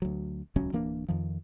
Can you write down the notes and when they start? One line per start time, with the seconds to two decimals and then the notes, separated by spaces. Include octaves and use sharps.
0.02 D2 F#3
0.56 D#1 C#2 F#3 C#4
0.72 D1 E3 A#3 D4
1.08 F2 D#3 F3